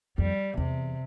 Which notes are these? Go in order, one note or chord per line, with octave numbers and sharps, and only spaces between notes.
F2 G3
E2 C3